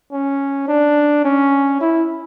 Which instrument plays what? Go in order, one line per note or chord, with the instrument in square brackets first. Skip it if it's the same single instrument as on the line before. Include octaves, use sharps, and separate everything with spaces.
[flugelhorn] C#4
D4
C#4
E4